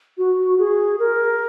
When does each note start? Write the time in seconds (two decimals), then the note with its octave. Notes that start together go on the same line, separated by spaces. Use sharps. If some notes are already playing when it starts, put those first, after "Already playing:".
0.18 F#4
0.59 G#4
0.99 A#4